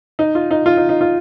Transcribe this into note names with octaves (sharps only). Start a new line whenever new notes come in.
D#4
F4
D#4
F4
D#4
D#4
F4